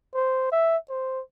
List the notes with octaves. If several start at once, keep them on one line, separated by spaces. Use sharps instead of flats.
C5
E5
C5